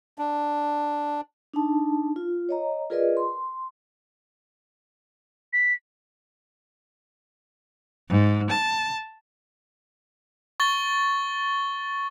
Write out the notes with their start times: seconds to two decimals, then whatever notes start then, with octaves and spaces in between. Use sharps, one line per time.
0.19 D4
1.54 D4 D#4 A5
2.16 F4
2.49 C#5 D#5 A#5
2.90 F4 G#4 A#4 B4 D5 D#5
3.17 C6
5.53 B6
8.09 G#2
8.50 A5
10.60 C#6 A6 G7